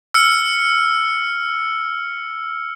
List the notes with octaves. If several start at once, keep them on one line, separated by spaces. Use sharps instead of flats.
E6 F6 C#7